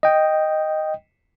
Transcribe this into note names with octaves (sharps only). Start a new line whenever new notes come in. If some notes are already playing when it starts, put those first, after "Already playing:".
D#5 G5